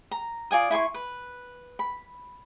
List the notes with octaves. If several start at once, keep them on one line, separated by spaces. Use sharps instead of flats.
A#5
F4 D5 G#5 D#6
E4 G#5 C6 C#6
B4
B5